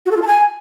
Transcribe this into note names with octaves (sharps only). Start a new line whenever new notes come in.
F#4
A4
F4
A5
G#5